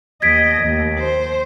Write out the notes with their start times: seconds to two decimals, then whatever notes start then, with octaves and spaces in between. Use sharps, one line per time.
0.22 D#2 D#5 G#6 B6 D7
0.61 D#2
0.99 C5